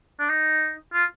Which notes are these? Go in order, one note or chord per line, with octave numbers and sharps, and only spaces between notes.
D4
D#4
F4